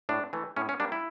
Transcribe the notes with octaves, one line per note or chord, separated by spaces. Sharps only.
A2 D4
E3 A3
A2 C#4
C#4
G3 A#3 D4
E4